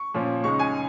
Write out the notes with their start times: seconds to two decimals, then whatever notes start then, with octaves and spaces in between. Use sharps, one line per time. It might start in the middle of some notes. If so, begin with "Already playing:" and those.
Already playing: C#6
0.14 A#2 F3 C#4
0.44 C#2 C#3 G#3 D#4 C#6
0.59 G#5